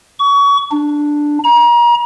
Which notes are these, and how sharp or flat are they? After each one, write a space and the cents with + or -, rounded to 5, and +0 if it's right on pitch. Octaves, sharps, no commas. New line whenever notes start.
C#6 +30
D4 +5
A#5 +35